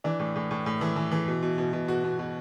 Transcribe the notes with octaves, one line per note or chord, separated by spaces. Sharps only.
E3 D4
A2
A2
A2
A2
E3
E3
E3
B2
B2
B2
B2
B2 F#4
B2
B2